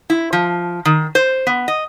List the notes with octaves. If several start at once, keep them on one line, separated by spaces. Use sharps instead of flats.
E4
F3
D#3
C5
B3
D#5